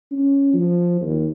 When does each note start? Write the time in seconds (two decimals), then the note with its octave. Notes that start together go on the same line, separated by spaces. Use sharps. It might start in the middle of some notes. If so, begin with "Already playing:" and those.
0.11 C#4
0.53 F3
1.01 D#2